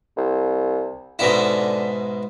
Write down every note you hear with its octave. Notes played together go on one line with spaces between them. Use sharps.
C2
G#2 B2 D3 E4